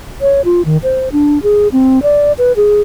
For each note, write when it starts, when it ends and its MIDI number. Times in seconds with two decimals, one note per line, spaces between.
0.21 0.41 73
0.45 0.65 65
0.65 0.77 51
0.83 1.09 72
1.12 1.42 62
1.43 1.68 68
1.72 2.03 60
2.03 2.32 74
2.38 2.52 71
2.56 2.81 68